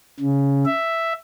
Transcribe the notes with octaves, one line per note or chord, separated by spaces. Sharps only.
C#3
E5